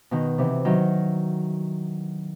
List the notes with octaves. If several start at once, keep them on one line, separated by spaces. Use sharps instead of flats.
B2 D#3
C3 E3
D#3 F#3